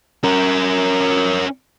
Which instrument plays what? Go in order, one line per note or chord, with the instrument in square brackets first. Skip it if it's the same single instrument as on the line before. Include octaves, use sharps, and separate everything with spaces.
[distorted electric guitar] C#4 A#4